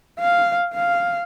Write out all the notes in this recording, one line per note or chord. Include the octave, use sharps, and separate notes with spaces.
F5
F5